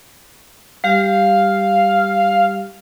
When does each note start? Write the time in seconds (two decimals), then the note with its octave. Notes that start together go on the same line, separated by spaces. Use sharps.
0.84 G3 G4 F5